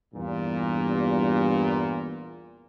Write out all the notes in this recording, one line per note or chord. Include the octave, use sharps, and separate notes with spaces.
E2 G2 A#2